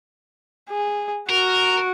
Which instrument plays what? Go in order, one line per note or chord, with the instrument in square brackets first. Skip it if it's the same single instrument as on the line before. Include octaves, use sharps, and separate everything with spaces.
[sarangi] G#4
[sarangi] F#4 [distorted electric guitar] A#4